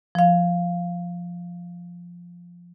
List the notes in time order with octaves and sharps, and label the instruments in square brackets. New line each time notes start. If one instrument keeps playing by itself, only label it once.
[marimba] F3 F5